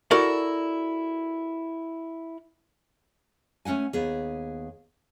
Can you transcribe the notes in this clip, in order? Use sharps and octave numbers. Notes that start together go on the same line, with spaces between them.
E4 F#4 A4 A#4 D5
A3 C#4 D4 F#5 G#5
D#2 B3 G#4